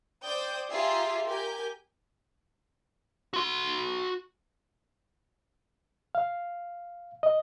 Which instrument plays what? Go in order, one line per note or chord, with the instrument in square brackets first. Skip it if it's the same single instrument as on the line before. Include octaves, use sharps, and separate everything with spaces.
[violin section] C5 D5 G5 D#6 G6
F4 G4 G#4 E5 A#5 C7
G4 A#4 G#5 G6
[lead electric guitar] F#4 C6
[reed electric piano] F5
D#5